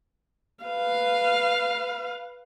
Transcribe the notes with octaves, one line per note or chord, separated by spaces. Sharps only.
B4 F5